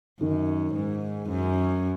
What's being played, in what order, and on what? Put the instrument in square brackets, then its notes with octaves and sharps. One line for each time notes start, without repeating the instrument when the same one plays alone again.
[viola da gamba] F#2 [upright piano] D#3
[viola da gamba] G#2
F#2